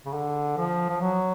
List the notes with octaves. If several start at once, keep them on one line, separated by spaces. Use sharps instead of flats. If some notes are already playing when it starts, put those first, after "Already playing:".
C#3
D3
F3
F3
F#3